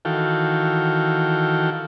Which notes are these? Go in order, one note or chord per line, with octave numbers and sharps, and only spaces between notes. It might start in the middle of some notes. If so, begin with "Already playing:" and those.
D#3 E3 F#4 A4 F5 G5